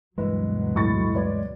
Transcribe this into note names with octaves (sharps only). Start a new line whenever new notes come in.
D2 G2 B2 E3 F#3 G#3 A#3 B4
A2 C#6 A6
B4 C#5 D5